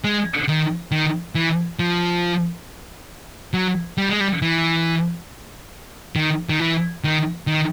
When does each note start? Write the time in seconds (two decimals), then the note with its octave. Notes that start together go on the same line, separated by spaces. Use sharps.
0.04 G#3
0.48 D#3
0.92 D#3
1.35 E3
1.79 F3
3.54 F#3
3.98 G3
4.09 G#3
4.20 G3
4.42 E3
6.16 D#3
6.49 D#3
6.60 E3
7.04 D#3
7.47 D#3